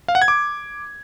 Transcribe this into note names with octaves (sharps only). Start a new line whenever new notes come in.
F5
F#5
G#6
D6